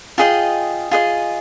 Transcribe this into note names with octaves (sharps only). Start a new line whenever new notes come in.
F4 G#4 D#5 G5
F4 G#4 D#5